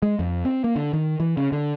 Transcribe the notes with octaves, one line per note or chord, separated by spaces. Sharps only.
G#3
F2
C4
A#3
D3
D#3
E3
C#3
D3